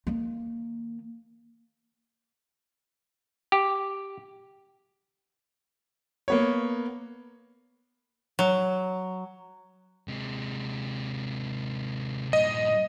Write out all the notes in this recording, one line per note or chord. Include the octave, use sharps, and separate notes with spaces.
D#3 A#3
G4
A#3 B3 C#5
F#3
C3 G#3
G2 A#2 D#5